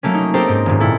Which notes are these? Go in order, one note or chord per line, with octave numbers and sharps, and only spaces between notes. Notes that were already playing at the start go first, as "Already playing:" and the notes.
F#3 A3 A#3 C#4
D#4
C4 D#4 G4 A4 A#4 C5
G#2
D#1 G#2
A#2 E4 A4